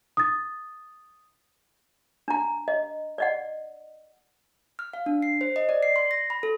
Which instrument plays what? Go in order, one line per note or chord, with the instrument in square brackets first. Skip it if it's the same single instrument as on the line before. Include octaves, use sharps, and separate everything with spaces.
[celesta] D#6 A6
[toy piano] D4 A#5
D#5
D5 D#5 F#5
[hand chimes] F6
F5
D4
C7
C5
D#5
D5
C7
C6
A#6
B5
A4